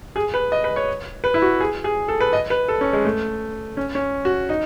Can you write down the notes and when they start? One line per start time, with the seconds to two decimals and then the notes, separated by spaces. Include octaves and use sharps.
0.16 G#4
0.34 B4
0.52 D#5
0.64 B4
0.76 C#5
1.24 B4
1.34 E4
1.42 F#4
1.61 G#4
1.84 G#4
2.08 A4
2.21 B4
2.33 D#5
2.50 B4
2.68 A4
2.81 C#4
2.93 G#3
3.05 A3
3.77 C#4
3.95 C#4
4.25 F#4
4.49 D#4